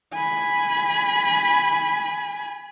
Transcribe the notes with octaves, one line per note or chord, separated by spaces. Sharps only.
G#5 B5